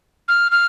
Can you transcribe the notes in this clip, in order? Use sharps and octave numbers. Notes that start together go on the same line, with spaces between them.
F6
F6